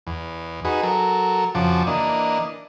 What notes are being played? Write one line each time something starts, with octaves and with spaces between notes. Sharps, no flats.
E2
D#4 F#4 G#4 B4
F#3 A4 A#4
F2 C#3 F3 F#4 A5 D6
E3 A#3 D4 D#5